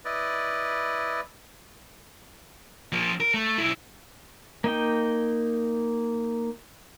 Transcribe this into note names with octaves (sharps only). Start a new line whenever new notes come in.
E4 B4 D5 D#5
F3 A#3
A#4
A3
B1 E4
A#3 D#4 G5